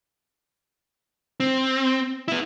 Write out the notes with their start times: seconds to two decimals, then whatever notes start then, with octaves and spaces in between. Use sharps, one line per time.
1.40 C4
2.28 B3 E4